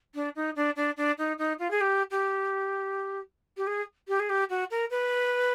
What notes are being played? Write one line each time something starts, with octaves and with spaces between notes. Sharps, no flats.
D4
D#4
D4
D4
D4
D#4
D#4
F4
G#4
G4
G4
G4
G#4
G4
G#4
G4
F#4
A#4
B4